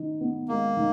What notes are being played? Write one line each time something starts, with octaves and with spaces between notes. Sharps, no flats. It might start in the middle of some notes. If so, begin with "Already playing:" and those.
Already playing: D#3 D#4
B3
G#3 A#3
D#3